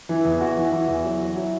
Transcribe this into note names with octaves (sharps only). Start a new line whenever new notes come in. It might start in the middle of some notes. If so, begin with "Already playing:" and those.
E3
E4
E2
E3 F#4
E3
E3
E2
F#3
F#3
F#3 E4